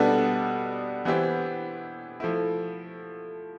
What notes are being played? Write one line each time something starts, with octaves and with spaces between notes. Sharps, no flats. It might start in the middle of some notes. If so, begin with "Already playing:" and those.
Already playing: B2 G3 B3 D4 A4
E3 B3 E4 G4 C5
F3 A3 E4